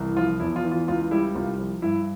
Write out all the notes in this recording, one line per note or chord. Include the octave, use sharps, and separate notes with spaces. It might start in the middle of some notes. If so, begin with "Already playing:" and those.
Already playing: C2 E3
F3 F4
E2 E4
F4
E3
F4
C#2 F4
G3 E4
C2 F4
F3
G2 E4